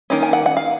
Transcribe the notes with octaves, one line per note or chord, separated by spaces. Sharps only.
D#3 A#3 C#4
G#5
F#5
F#5
F5